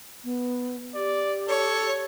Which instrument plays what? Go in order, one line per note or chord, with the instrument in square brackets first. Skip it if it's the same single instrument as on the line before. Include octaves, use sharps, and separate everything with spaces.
[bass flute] B3
[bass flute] G4 [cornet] D5
[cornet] A4 [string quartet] C#5